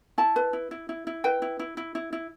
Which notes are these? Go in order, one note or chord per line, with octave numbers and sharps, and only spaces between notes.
E4 A5
B4
E4
E4
E4
E4
B4 G5
E4
E4
E4
E4
E4